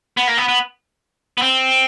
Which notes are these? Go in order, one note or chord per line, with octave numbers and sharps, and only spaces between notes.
B3
A#3
B3
B3
B3
C4